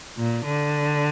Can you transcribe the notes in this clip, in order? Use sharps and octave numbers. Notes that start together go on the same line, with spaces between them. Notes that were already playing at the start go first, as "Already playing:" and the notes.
A#2
D3